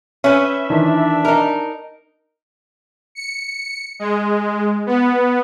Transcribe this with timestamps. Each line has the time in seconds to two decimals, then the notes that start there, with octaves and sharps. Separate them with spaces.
0.24 C#4 B4 E5
0.70 D#3 E3 D4
1.25 D#4 A#4
3.15 C#7
3.99 G#3
4.87 B3